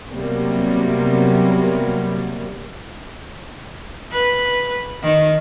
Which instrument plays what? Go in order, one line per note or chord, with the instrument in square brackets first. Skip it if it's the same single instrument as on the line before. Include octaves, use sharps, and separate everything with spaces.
[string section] C3 F#3 G3 A#3 B3
[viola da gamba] B4
D#3